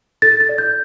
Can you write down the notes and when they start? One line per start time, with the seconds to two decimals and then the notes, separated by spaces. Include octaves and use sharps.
0.22 A4 A6
0.40 A6
0.49 D5
0.58 G6